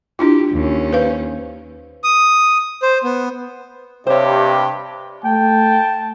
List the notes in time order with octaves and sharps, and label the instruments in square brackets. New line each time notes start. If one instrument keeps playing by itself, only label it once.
[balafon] D4 E4 F4 [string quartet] G4
[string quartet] D#2 C#4
[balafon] B4 C5 F5
[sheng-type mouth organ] D#6
C5
B3
[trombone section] G2 [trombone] C3 [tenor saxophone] G4 [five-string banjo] C5 C#5
[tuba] A3 [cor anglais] G5 [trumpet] A5